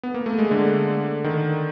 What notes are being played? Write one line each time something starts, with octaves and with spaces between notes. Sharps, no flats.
B3
A#3
A3
G#3
D3
D#3